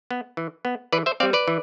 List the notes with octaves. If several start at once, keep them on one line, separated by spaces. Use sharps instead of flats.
B3
E3
B3
E3 B4 D5
C5 E5
G3 C4 D5 F5
B4 D5
E3